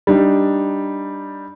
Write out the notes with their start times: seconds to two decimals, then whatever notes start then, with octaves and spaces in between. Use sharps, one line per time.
0.07 G3 D4 D#4